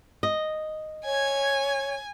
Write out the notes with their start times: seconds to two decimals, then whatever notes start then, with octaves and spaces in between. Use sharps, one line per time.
0.23 D#5
1.05 C#5 G#5